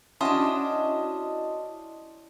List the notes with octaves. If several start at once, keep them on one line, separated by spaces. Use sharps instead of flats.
C#4 D4 E4 F#4 D#5 A5 C6 D#6